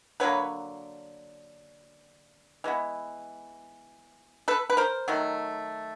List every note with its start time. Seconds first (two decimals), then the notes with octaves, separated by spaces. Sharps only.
0.20 D3 F#3 A#3 B4 C#5
2.64 E3 G#3 B3
4.48 A4 B4
4.70 B4
4.77 A#4 C5
5.08 D#3 F#3 A3